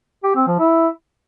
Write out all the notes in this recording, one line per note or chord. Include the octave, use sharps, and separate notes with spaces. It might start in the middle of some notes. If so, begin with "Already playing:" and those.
G4
C4
F3
E4